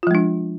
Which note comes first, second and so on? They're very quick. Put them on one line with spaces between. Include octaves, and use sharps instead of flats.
F4 F3 G#3 D4